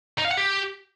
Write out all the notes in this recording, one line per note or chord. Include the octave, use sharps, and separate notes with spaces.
D#4
F5
F#5
G4